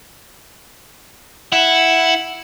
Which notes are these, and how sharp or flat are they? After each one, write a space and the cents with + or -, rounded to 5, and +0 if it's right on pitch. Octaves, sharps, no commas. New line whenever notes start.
E4 +0 F#5 +0